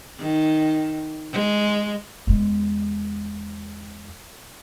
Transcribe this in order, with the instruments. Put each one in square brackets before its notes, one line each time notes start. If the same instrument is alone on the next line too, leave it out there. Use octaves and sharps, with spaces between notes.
[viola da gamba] D#3
G#3
[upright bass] E2 G#3